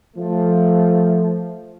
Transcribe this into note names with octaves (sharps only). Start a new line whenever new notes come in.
F3 A3